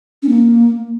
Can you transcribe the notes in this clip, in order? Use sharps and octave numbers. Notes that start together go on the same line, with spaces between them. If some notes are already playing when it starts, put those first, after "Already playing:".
C#4
A#3